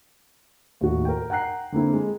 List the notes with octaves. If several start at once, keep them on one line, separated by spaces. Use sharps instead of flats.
D#2 A2 F#4
A#4 G5
F#5 G5 A#5 F#6 C7
D3 A#3 C4 E4
G#3